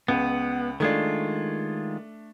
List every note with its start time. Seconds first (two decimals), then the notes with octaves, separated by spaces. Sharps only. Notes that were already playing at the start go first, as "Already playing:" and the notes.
0.08 C#2 B3
0.80 D#3 G#3 A3 D4 F4